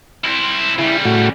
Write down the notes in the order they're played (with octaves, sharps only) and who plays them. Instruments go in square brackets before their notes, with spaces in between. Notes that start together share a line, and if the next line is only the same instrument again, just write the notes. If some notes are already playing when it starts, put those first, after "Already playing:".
[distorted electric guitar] C4 E4
[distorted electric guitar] C#3 G3 [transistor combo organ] E4
[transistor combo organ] A2 F#4